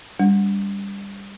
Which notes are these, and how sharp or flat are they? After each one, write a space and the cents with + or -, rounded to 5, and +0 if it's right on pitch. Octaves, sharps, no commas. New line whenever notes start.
G3 +25 D4 -40